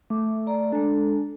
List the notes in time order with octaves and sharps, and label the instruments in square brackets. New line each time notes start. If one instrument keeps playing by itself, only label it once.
[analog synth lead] A3 [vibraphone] D6
[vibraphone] D5 A#5
[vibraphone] G#3 A4 [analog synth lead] D4